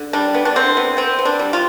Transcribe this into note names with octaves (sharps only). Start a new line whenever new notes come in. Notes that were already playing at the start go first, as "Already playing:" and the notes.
Already playing: D3
G3 D4
B3
D4
D3 C4
B3
B3 C4
B3
D4
G3
F4